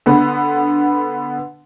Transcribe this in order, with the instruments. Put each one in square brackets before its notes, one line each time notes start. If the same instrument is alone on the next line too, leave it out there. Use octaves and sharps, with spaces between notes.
[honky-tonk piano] D3 B3 B4